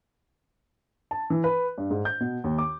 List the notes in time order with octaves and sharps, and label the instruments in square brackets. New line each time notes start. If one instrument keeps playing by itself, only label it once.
[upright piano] A5
E3
B4
G2
G#2
G6
B2
D#2
D6